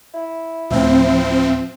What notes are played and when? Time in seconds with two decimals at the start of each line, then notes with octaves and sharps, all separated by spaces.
0.14 E4
0.70 D2 A2 F3 C4 E5